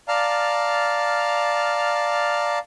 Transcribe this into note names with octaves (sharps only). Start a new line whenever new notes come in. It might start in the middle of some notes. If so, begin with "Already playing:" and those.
D5 F5 A5 A#5 F6